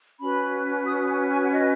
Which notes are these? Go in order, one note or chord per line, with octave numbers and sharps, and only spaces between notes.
C#4 F#4 B4 B5
D#6
G#5
G#5
F#5
D#5